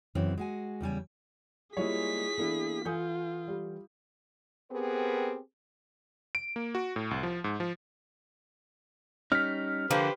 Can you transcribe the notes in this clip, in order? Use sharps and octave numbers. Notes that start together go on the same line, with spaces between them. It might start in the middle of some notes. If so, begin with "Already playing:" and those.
F#2 C#3 E3 C4
G#3 F#4 G#5
E2 C#3 G3 G#5
G3 G#3 A#3 E4 F4 G#4 C#5 B6
E3 A#3 B3 D4 E4 A4
E3 F4 A4 F#5 G#5 D#6 G6
G3 G4
B3 C4 G4 G#4 A#4 B4
D7
A#3
F#4
A2
C2
F3
G#2
F3
G3 C#4 D#4 F6 B6
D3 F3 A#3 G4 B4 C5